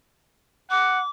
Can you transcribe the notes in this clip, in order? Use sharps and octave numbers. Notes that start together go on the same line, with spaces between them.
F#5 D6